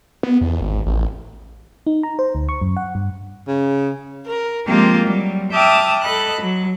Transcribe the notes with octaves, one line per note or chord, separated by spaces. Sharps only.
B3
E2
G#1
A1
D#4
A#5
C5
D2
C#6
F#2
F#5
G2
C#3
A#4
F3 G#3 A#3 C4 F4 G4
F#3 G3
E5 G5 A5 D6 D#6 F6
A4 D#5 B5 F#6
F#3